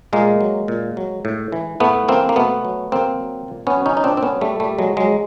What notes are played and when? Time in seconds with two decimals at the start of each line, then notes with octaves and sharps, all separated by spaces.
0.13 A#2 G#3 A#3
0.41 F#3
0.68 A#2
0.97 F#3
1.25 A2
1.52 E3
1.80 A2 A3 B3
2.08 E3 A#3 C4
2.29 A#3
2.36 B2 A3 B3
2.65 F#3
2.92 B2 A#3 C4
3.20 F#3
3.48 A#2
3.67 B3 C#4
3.77 F#3
3.86 C#4 D#4
3.97 D#4
4.03 A#2 C4 D4
4.17 C4
4.23 B3 C#4
4.32 F#3
4.41 G3 A3
4.60 A#2 G3 A3
4.78 F#3 G#3
4.88 F3
4.97 F#3 G#3